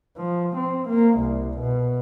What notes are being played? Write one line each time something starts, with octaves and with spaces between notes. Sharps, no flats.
F3
C4
A#3
C2
B2